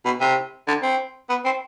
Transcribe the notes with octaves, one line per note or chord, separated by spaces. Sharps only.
B2
C3
D3
C4
B3
C4